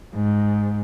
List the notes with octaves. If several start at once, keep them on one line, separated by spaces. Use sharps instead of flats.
G#2